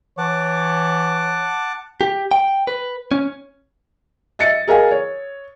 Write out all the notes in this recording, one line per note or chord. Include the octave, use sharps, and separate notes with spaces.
E3 C#5 F#5 A5 D6
G4
G5
B4
C#4
D#5 E5 A6 C#7
G#4 A#4 D#5 F5 G#5
C#5